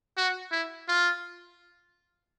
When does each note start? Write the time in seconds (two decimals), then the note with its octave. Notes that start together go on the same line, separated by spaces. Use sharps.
0.17 F#4
0.52 E4
0.88 F4